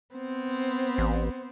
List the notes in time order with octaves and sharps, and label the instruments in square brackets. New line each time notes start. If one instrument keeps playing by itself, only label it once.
[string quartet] B3 C4 C5
[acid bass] A1